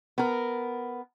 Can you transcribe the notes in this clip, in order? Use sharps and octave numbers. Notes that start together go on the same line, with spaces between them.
B3 A#4